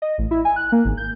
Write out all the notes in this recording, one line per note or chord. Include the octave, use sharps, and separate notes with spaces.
D#5
A1
E4
G#5
F#6
A#3
G#1
G6